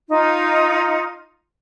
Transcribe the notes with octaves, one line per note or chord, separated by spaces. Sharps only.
D#4 F4